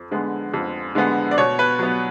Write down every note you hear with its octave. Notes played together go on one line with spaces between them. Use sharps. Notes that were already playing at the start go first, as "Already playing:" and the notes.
Already playing: F2
D3 G#3 B3
F2
D3 G#3 B3
D5
B2 C#5
B4
F#3 B3